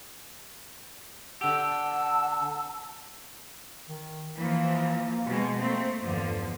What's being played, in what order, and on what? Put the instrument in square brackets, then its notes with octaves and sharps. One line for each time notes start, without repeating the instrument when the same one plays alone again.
[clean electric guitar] D3 G4 [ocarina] F#5 [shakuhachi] A5 [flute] E6
[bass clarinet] D#3
[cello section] E3 F3 [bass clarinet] A#3
[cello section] B2 G#3
[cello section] A3 C4 [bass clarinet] A#3
[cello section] E2 D3 F3 [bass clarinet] G2